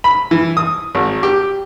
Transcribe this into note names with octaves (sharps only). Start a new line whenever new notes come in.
B5
E3
D#6
G#1
G4